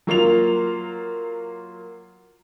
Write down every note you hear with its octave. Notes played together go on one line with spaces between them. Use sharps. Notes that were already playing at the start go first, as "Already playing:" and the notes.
F#3 A#3 F4 F7